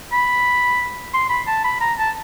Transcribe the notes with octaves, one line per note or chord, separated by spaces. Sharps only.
B5
C6
B5
A5
B5
A#5
A5